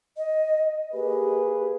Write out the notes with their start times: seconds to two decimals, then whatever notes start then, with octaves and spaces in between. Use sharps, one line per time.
0.17 D#5
0.93 A#3 G4 G#4 B4